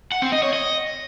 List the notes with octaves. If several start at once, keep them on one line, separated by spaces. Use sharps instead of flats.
F#5
C4
D#5
C#5
D#5